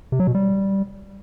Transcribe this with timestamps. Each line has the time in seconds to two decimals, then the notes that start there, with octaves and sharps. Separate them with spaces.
0.12 C3
0.20 F#3
0.27 B2
0.35 G3